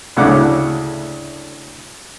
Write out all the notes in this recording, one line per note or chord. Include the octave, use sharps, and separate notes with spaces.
D2 A2 C#3 F#5 D6